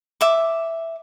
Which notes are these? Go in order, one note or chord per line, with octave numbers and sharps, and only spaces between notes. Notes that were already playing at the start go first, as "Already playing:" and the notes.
E5 D6